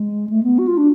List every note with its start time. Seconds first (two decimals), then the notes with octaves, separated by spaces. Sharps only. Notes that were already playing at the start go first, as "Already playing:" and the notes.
Already playing: G#3
0.29 A3
0.43 B3
0.58 F#4
0.67 F4
0.77 D4